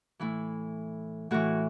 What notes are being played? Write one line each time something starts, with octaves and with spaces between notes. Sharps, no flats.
A2 E3 E4
A2 E3 F#4